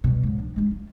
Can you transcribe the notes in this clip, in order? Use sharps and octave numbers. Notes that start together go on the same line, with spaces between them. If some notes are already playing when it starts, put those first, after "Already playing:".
B2 G3
C#2 G#2
F3 D4
G#3 D#4
F4